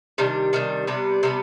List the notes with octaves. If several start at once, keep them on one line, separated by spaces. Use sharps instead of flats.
C3 D#3 G3 D4
C3 D#3 G3 D4
C3 G3 B3 D4
C3 G3 B3 D4